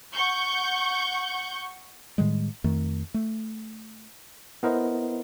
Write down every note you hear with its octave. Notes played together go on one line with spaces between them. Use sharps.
F#5 C#6 G6
A2 D#3 G3 G#3
F2 D#3 A3
A3
B3 E4 A#4 C5 D#5